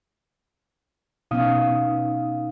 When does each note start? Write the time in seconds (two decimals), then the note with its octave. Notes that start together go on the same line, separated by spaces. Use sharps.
1.31 B2 B3 C#4 D#4 F5 D#6